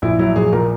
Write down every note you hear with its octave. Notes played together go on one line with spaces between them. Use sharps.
A#1 E4
F#3 E4
A#1 G#4
A#2 A#4